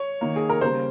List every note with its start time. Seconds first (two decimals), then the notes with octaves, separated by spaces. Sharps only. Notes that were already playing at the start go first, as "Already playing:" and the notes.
Already playing: C#5
0.21 D#3 A#3
0.36 G#4
0.49 A#4
0.61 C#3 G3 A#3 C5